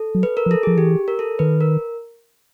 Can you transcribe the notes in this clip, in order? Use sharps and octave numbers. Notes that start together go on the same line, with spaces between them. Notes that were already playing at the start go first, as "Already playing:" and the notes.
Already playing: A4
F#3
B4
A#4
F3
A4
F3 G#4
E3 G4
A#4
A4
D#3 B4
A#4